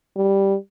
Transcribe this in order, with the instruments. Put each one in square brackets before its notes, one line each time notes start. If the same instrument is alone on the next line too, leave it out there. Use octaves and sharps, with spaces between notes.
[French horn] G3